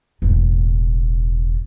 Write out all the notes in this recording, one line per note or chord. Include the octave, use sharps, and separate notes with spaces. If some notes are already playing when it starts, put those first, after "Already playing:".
E1 A2